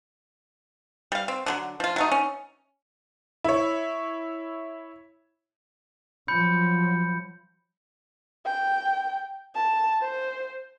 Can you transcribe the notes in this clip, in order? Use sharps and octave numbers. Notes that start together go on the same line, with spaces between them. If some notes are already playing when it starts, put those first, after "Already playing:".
G3 F5
C4
D3 F3 F#3
F3 F4
F#3 A3 D#4
C#4
E4 C#5
F3 F#3 B5 G6 C#7
G5
A5
C5